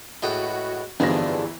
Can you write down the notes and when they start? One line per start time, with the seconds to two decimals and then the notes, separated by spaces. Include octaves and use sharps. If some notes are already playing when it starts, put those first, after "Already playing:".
0.23 A2 G#3 F#4 B4 D#5 G5
1.00 G1 F2 D#3 E3 G3 D4 G#4 A#6